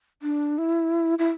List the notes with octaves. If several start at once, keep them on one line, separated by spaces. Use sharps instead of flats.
D4
E4
E4